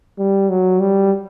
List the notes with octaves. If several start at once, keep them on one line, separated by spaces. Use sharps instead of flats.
G3
F#3
G3